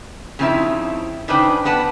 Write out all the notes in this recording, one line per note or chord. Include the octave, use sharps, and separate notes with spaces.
C#3 F3 C4 D#4 E4
C#3 D4 D#4 B4 C5 G5
B3 B4 A5